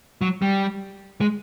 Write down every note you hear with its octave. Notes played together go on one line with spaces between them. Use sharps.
F#3
G3
G#3